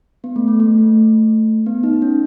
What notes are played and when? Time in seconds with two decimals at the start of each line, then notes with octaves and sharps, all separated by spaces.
0.24 B3
0.36 A3
0.48 A3
0.60 A3
0.78 A3
1.66 B3
1.83 D#4
2.02 C#4